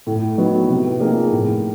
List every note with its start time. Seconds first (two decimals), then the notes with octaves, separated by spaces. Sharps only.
0.07 A2
0.37 F#3 B3 D#4
0.69 C3
1.00 F3 A#3 D#4 G#4
1.31 A2